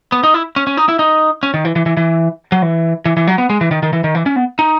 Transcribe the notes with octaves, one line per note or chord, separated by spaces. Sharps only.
B3
D#4
E4
C#4
C#4
D#4
E4
D#4
C#4
D#3
E3
E3
E3
E3
F#3
E3
E3
E3
F#3
B3
G#3
E3
D#3
D#3
E3
D#3
E3
C#4
B3
D#4